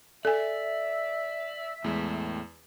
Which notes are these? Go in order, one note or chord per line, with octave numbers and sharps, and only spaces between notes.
A4 D5 E5 G#5
E2 A2 G#3